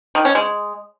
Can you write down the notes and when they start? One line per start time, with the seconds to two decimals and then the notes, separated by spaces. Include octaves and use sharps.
0.15 D#3
0.25 C#4
0.35 G#3